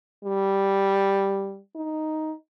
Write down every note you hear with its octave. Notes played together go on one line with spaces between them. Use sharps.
G3
D#4